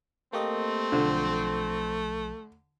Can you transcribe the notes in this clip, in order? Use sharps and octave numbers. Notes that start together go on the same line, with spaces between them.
A3 A#3 C4 G4 D#5
B1 D3 F3